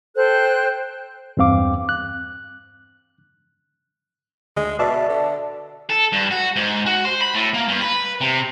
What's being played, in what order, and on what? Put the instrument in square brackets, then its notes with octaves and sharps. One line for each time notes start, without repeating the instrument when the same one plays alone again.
[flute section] A4 C5 G5 F#6
[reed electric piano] E2 G2 C4 F5 D6
F#6
[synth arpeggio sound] D2 [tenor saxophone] G#3
[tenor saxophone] B2 [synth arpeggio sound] D5 E5 A5
[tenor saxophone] D3
[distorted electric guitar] A4
G2
F#4
G#2
F#4
C5
B5
A2
A#3
G2
B4
C3